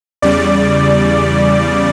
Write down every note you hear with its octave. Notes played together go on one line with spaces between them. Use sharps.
E2 C#3 G3 D5